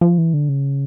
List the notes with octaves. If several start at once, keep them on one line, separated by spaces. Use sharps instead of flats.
F3
E3
D3
C#3